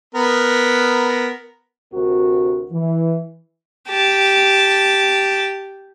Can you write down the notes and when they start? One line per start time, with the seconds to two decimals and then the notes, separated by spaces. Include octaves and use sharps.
0.15 B3 A#4
1.93 D2 C3 F#4 A#4
2.71 E3
3.88 G4 A5